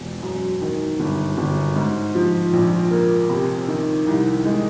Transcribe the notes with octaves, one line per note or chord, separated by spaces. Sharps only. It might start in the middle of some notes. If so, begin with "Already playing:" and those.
Already playing: E1
F#2
D#3
G1
G1
G#2
F3
A#1
A#3
C3
D#3
C2
G#3